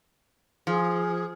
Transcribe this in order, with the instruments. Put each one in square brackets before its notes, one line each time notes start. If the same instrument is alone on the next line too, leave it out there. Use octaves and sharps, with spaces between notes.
[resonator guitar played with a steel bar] F3 [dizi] G#4